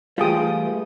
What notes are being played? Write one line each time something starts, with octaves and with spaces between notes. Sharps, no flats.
E3 G3 A3 F4 G#4 A4 G5 D#6